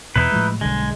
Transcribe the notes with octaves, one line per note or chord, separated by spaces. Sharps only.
E2 B2 D#4 E4 B4
A2 F3 G#3
B1 G2 D3 G#3